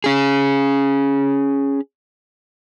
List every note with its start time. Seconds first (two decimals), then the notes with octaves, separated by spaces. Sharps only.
0.04 C#4 G#4